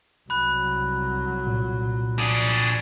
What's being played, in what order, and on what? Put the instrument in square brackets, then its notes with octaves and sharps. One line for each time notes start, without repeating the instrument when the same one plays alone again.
[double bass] C2 F#3 [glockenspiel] B5 F#6
[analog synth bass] A#2
[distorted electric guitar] D4 G#4